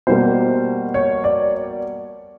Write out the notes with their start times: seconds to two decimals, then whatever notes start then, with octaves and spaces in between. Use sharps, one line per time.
0.07 B2 G3 A#3 C5
0.94 C#5
1.24 D5